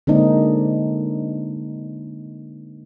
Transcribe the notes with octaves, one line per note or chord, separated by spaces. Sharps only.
D3 G#3 A#3 C4 D4 D#4